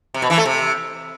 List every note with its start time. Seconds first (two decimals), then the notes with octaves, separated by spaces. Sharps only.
0.14 C3
0.22 B2
0.30 E3
0.38 A3
0.45 C3